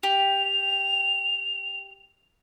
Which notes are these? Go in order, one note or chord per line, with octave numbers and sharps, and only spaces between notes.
G4 F7